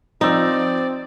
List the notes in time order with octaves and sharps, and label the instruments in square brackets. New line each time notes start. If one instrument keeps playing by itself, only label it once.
[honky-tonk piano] F3 E6 [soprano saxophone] C4 [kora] D#4 [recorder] D5